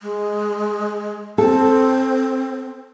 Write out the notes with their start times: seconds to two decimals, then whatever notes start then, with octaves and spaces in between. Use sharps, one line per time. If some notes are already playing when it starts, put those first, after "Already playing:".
0.01 G#3
1.38 C4 A4